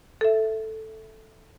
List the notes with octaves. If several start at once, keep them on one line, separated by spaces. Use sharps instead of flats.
A4 E5